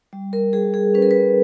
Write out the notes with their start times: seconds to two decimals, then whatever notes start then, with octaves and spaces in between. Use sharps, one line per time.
0.13 G3
0.33 A#4
0.53 G3 G#4
0.74 G#4
0.94 C#4 B4
1.02 A#4
1.11 B4